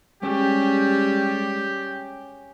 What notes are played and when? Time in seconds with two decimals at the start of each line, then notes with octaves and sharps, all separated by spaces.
0.23 G3 G#3 C#4 G4